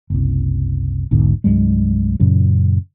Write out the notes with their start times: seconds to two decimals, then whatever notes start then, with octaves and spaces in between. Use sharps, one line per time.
0.10 F#1 C2
1.11 E1 B1 G#2 D3
1.44 C2 G2 F#3 G#3
2.20 F#2 A#2 C#3 F#3